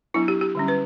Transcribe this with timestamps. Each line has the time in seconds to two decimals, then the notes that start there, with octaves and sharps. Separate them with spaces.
0.14 F#3 B3 D4 E4
0.28 G4
0.41 G4
0.55 D3 G3 C#4
0.68 B4